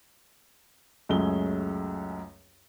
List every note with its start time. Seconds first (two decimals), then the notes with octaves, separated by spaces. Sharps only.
1.09 C#2 F#2 A3 C#4 G#4 G7